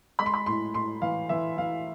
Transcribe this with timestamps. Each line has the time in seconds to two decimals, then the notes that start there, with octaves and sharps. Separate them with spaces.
0.19 G#3 B5
0.26 C6
0.34 B5
0.46 A2 C6
0.74 A2 C6
1.02 E3 F5
1.29 E3 E5
1.57 E3 F5